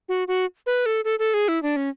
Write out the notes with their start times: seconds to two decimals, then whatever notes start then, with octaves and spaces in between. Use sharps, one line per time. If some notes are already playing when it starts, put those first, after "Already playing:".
0.09 F#4
0.28 F#4
0.66 B4
0.86 A4
1.05 A4
1.19 A4
1.34 G#4
1.48 E4
1.63 D4
1.76 C#4